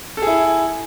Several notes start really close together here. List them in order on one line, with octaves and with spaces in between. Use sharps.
A4 G#4 E4